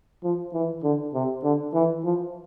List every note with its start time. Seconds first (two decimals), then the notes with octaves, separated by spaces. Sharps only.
0.23 F3
0.54 E3
0.83 D3
1.14 C3
1.44 D3
1.74 E3
2.05 F3